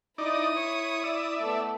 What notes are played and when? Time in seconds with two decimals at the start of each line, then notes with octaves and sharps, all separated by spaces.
0.18 D#4 E4 D5 D#6
0.56 C#5
1.04 D5 E5
1.39 A3 B3